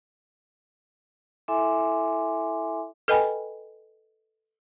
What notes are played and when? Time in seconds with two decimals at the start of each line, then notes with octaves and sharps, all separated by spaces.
1.48 E4 A4 E5 G#5 C6 D6
3.08 A4 B4 D#5 G5 G#5 B5